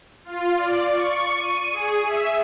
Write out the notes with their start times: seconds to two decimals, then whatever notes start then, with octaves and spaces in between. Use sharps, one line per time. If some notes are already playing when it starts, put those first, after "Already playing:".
0.24 F4
0.57 D5
0.93 C#6
1.35 D#7
1.71 G#4
2.05 E5